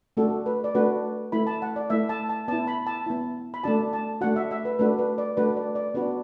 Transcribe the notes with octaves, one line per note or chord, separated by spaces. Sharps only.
A3 D4 F#4 A4
B4
D5
A3 D4 F#4 B4
A3 E4 B5
A5
F#5
D5
A3 E4 E5
A5
A5
B3 E4 A5
B5
A5
B3 E4
B5
A3 D4 F#4 A5
A5
A3 D4 F#4 F#5
E5
E5
B4
A3 D4 F#4 B4
B4
D5
A3 D4 F#4 B4
D5
D5
B3 D4 F#4 B4